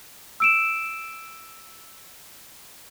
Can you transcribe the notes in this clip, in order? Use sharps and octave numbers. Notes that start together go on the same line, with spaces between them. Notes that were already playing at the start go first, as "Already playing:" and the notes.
E6 D7 E7